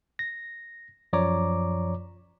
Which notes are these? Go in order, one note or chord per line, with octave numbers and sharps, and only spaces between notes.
A#6
F#2 F3 C#5 D5 A#5 D6